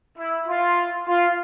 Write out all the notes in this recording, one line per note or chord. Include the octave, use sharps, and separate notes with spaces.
E4
F4
F4